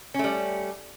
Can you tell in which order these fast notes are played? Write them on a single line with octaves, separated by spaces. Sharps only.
C#4 A3 G3